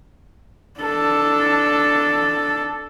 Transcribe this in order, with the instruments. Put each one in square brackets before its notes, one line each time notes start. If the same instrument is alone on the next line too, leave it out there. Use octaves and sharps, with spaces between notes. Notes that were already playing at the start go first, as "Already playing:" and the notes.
[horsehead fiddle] D4 A4